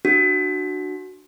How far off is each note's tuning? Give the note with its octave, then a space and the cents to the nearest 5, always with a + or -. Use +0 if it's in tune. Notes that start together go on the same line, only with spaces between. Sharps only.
D4 +25 F#4 +0